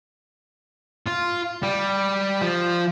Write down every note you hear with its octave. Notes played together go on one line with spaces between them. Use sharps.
F4
G3
F3